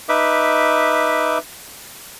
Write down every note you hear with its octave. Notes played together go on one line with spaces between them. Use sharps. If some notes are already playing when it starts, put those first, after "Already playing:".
D#4 B4 E5 D6